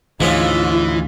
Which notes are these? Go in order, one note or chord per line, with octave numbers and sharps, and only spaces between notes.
D2 G#2 E3 F3 C#4 F4